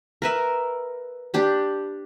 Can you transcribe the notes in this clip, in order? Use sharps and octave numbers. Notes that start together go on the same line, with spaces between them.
A#4 B4 E5
D4 G4 B5